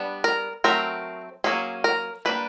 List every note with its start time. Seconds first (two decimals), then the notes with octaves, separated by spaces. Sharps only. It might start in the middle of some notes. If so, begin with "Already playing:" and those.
Already playing: G3 B3 D4
0.24 A#4
0.64 F#3 A3 C4 A#4
1.44 F#3 A#3 C#4 G#4
1.84 A#4
2.25 G3 A#3 D4 B4